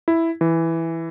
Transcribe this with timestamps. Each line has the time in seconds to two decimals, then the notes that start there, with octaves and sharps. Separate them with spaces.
0.08 E4
0.41 E3